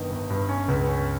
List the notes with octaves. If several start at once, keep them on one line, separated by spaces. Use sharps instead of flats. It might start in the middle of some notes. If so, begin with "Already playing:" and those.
Already playing: G1 G2 D#3
G1
G2
C#4
C#2
C#4